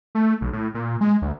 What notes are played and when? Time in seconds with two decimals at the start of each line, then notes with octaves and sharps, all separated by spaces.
0.15 A3
0.41 B1
0.53 A2
0.74 A#2
1.01 G#3
1.22 D2